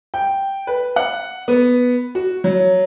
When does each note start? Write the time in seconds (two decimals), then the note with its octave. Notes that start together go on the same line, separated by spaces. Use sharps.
0.14 G5
0.67 B4
0.96 F#5
1.48 B3
2.15 F#4
2.44 F#3